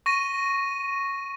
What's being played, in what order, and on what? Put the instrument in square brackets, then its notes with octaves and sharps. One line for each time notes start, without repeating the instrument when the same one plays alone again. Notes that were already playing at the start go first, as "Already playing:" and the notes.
[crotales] C#6 A#6 D#7